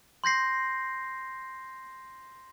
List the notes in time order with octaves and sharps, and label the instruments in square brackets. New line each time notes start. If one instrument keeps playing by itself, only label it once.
[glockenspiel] C6 G6 A#6 C7